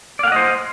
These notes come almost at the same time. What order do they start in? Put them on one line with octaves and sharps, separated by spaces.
D5 F5 F#5 D#5 C5